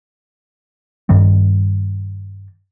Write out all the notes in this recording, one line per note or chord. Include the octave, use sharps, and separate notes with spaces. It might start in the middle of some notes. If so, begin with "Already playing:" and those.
G2 D#3 G3 C4